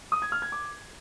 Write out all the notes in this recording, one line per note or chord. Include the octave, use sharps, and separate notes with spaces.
D#6
G#6
F6
G#6
D6